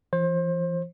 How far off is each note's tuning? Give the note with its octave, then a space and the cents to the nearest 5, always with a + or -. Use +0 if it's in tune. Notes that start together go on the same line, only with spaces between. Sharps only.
E3 +45 C5 +30